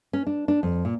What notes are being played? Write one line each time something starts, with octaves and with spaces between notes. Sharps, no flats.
C#4
D4
D4
F2
A#2